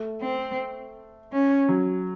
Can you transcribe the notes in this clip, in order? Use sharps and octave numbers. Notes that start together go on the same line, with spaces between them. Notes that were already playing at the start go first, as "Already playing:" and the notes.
Already playing: A3
C4
C#4
F#3